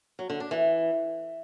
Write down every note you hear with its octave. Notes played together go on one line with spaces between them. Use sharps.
F#3
D3
D4
E3